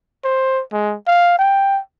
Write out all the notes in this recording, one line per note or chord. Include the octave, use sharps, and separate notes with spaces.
C5
G#3
F5
G5